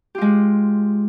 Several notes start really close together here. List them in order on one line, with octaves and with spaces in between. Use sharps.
G4 F4 G#3